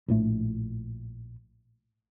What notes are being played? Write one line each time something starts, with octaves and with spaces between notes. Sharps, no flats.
A#1 A2 A3